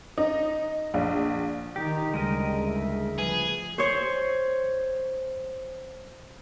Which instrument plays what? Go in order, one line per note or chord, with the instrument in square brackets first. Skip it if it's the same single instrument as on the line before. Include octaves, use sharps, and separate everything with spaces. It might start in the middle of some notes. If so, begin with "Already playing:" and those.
[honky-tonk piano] D#4
A#1
[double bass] D#3 D#4 [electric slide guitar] G4
[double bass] D2 [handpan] C#3 G3 [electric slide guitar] G#3 A#4 D#5
[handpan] E4 E5
[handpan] F3 B4 [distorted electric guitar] G#4
[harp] C5 C#5